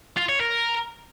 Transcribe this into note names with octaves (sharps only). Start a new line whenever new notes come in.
F4
C#5
A#4